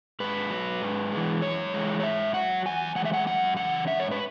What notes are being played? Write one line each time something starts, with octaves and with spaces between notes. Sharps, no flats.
G#2 B4
F#3
G#2
E3 G#3
F#2 C#5
E3 G#3
C#5
G#2 E5
F#3 F#5
E2 G#5
E3 G#3 F#5
E5
F#5
F#2 F#5
C#3 E3 F#5
G#2 E5
C#5
B4